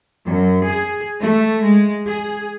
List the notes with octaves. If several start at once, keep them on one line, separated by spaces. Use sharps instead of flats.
F#2
G#4
A3
G#3
G#4